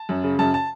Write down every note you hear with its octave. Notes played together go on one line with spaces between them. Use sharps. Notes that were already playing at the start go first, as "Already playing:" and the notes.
Already playing: A5
F#2
C#3
F#2 A5
A5